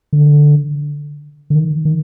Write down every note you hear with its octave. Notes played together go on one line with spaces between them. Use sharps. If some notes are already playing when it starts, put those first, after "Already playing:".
D3
D3
D#3
D#3